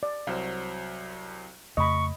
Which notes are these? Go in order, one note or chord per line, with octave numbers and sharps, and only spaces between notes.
D5
C2 F#3 C5 F5
F2 C#3 A3 D#5 B5 C#6